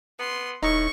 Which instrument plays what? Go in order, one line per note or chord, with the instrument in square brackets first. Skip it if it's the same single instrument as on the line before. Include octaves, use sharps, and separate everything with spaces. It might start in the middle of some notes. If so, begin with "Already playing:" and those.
[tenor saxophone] B3 [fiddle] C6
[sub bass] D#1 [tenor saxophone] A2 [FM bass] D#4 [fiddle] C#6